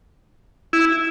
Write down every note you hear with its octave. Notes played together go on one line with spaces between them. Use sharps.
E4